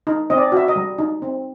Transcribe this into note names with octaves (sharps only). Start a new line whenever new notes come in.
D#4
C4 D#5
D5
F#4 E5
D#5
G3
D#4
C4